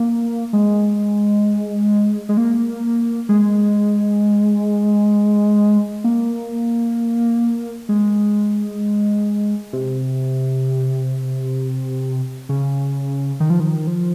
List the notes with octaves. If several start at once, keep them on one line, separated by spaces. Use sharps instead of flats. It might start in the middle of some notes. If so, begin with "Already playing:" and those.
Already playing: A#3
G#3
G#3
A#3
G#3
A#3
G#3
C3
C#3
D#3
F3
D#3
F3